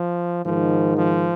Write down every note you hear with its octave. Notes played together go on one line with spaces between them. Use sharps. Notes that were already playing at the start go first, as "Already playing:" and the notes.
Already playing: F3
G#2 D#3 F3
F3